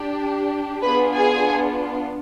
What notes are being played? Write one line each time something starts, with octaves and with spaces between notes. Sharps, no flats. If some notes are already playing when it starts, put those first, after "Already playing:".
Already playing: D4 G4
B3 D4 F4 G#4 B4 B5
G#4 G#5